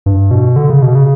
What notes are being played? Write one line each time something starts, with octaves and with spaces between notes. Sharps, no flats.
G2
B2
D3
C#3
B2
C#3